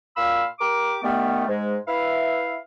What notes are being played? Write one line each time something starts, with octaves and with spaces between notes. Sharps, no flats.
A#2 F4 F5 B5 E6
G4 A#4 D6
D#3 G3 A3 B3
G#2 G#3
E4 B4 E5 F5